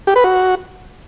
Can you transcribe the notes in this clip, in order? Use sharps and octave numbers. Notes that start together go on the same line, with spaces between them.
G4
B4
F#4